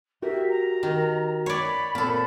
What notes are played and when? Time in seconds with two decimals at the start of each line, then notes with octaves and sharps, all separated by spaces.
0.22 F#4 G4 A#4 E5
0.49 A#5
0.83 D#3
1.46 C#5 D5 B5
1.95 A#2 C4 A4